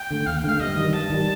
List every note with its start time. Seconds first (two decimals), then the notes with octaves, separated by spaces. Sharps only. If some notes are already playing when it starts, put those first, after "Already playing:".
Already playing: G5
0.11 D3 A3
0.26 D#2 F5
0.37 G5
0.44 D3 A3 F5
0.60 G2 D#5
0.77 D#3 G3
0.93 G2 A5
1.10 D#3 G3